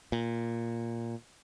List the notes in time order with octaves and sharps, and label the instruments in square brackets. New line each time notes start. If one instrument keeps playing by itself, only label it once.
[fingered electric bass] A#2